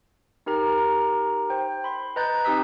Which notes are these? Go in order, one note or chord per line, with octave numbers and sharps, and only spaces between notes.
D#4 G4 A#4 A#5
C5 G5
B5 C6
B4 D#5 A#5 F#6 G6 A6
C4 D#4 G4 D#6 E6 B6